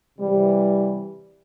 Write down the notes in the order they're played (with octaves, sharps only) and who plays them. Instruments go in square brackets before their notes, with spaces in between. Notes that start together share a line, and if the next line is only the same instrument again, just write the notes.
[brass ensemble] C3 E3 G3